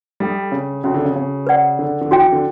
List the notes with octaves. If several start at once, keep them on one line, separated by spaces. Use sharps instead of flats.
G3 D4 A4 E5 G5
C#3
C#3 C#4 F#4 A4 E5 A5
D3
C#3
C#3
B4 D5 F#5
D3
D3
E3 C#4 F#4 C#5 G5
E3
D3